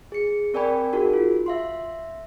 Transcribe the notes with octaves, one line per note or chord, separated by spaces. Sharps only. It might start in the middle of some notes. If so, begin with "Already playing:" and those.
G#4 C#7
C4 A#4 D5 G5 G#5 B5
D#4 F#4 G#4 A#4
F4
E5 F5 C6